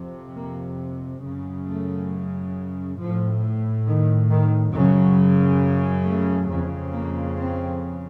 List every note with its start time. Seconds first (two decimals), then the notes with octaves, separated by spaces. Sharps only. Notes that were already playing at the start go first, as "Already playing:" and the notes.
Already playing: F2 C3
0.35 A#3
1.24 F#2 C#3
1.67 A3
2.99 A2 F3
3.87 D#3
4.30 D#3
4.74 F#2 C#3 F#3
6.06 A3
6.49 F2 C#3
6.93 A#3
7.37 C4